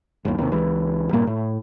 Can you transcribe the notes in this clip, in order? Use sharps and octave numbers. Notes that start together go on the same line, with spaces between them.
G1 D#2
D#2 C3
C#2 E3
G2 A#2 A#3
A2